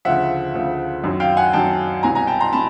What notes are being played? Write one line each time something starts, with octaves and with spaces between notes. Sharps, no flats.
D2 C#3 F3 E5 F#5
D2 C#3 F3
F#2 D#3 F#3
F5 G5
F#5 G#5
F#2 D#3 F#3 G5 A5
C2 B2 F#3 G#5 A#5
G#5 A#5
G5 A5
A#5 C6
B2 A5 B5